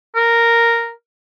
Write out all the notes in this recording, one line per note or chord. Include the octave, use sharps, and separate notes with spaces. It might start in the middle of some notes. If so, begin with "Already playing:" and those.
A#4